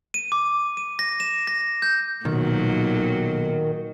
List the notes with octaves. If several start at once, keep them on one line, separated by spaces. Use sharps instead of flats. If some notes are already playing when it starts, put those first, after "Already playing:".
D#7
D6
D#7
A#6
E7
A#6
G6
B1 A#2 D#3 F#3